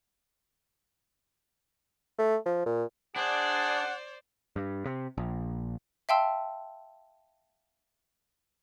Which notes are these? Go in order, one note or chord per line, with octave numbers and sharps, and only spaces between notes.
A3
F3
A#2
D4 G#4 C5 D5 F#5
G2
C3
A#1
E5 F5 G5 A5 C6 E6